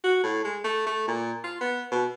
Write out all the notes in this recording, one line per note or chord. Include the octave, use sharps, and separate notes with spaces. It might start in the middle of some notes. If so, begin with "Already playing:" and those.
F#4
A2
G#3
A3
A3
A#2
F4
B3
B2